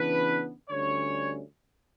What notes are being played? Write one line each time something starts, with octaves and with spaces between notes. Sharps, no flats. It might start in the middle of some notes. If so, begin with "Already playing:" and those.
Already playing: C#3 E3 B3 D4 B4
D2 D3 G3 C#4 C#5